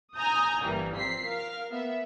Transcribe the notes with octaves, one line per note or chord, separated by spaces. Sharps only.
G#5 A#5 D#6 G6
G1 E3 G3 A#3
F3 C4 B6 C7
A#4 F5
B3 E5